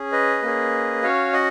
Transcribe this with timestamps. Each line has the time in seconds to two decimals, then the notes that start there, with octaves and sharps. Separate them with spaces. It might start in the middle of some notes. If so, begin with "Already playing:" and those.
Already playing: C#4 G#4
0.12 B4 D#5
0.42 A#3 C#4 G#4
1.03 C#4 F#4 C#5 F5
1.33 D#5 F#5